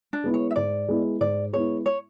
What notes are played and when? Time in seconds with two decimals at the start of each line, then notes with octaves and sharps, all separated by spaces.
0.13 D4
0.24 G#3 B3 E4
0.34 C#5
0.51 E5
0.56 G#2 D5
0.88 G#3 B3 E4
1.20 G#2 D5
1.53 G#3 B3 E4 C#5
1.86 C#5